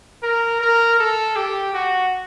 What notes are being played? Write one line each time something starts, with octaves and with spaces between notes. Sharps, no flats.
A#4
A#4
A4
G4
F#4